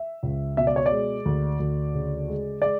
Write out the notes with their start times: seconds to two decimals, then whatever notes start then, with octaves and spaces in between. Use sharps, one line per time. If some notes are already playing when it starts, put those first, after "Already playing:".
Already playing: E5
0.23 C#2
0.57 B2 E5
0.67 D5
0.76 C#5
0.86 D5
0.92 G#3
1.25 D2
1.60 D2
1.94 C#3
2.28 G#3
2.62 G#3 D5